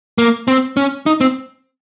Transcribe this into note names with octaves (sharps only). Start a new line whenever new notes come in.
A#3
C4
C#4
D#4
C4